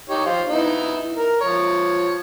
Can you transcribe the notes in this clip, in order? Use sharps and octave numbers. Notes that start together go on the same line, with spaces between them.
D#4 G4 C#5
C5 F5
B3 D#4 E4
A#4
F3 C#5